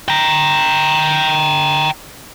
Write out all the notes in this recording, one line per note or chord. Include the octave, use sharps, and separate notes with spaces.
G5 A#5